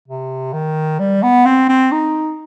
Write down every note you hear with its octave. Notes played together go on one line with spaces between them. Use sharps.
C3
D#3
G3
B3
C4
C4
D#4